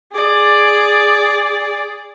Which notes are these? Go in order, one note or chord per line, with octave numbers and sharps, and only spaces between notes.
G#4 D5